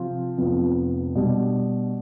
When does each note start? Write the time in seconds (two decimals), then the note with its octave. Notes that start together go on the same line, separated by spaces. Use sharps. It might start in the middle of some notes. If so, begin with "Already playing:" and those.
Already playing: C3 F3 C4 F4
0.37 F1 F2 C3 F3 B3
1.15 B2 G3 D4